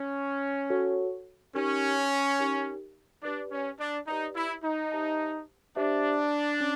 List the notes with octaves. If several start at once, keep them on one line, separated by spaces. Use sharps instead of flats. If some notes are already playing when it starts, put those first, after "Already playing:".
Already playing: C#4
F#4 A4 C#5
C#4 D#4 G4 A#4
D#4 G4 A#4
D4 G4 B4 D5
C#4
D4
D#4 G4 B4 D5
E4
D#4
G4 C5 E5 A5
D4 G4 C5 E5 A5
C#4